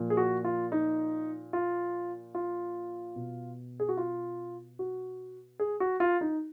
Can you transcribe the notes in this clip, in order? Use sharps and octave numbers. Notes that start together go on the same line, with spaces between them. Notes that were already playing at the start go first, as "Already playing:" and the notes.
Already playing: A#2 F3
G#4
F#4
F4
D#4
F4
F4
B2
G#4
F#4
F4
F#4
G#4
F#4
F4
D#4